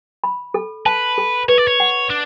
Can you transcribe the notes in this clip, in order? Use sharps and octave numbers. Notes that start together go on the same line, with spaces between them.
B5
A4
B4 A5
A4
B4 C#5
D5
C#5
F#5
D4